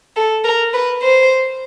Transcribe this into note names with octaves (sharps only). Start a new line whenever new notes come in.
A4
A#4
B4
C5